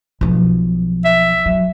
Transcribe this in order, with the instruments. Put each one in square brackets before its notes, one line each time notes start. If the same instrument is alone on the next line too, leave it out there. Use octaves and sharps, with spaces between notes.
[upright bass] B1 F3
[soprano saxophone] E5
[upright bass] F#3